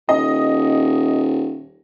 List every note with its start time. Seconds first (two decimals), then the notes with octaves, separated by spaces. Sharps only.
0.09 D#1 D#5